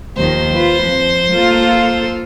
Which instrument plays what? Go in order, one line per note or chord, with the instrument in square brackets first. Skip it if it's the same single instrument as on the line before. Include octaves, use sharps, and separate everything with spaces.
[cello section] D#2 D#3 F3 [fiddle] C5
[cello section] F4 B4
F2 F3
A#3 F4 A4